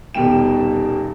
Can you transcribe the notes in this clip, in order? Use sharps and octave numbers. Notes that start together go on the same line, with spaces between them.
D#1 B2 D#3 G3 G5 E7